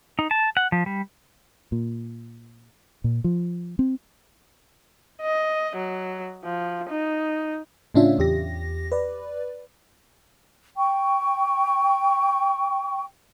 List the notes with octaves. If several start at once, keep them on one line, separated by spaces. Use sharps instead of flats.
D#4
A5
F#5
F3
G3
A#2
A#2
F3
C4
D#5
F#3
F3
D#4
A2 C#3 C#4 D4 F4 E5
E2 G4 A#6
B4 D5
G5 C#6